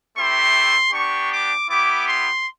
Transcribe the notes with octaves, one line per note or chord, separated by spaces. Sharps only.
A3 C4 E4 G4 C6
B3 D4 G4 C#6
D6
B3 E4 G4 D6
C6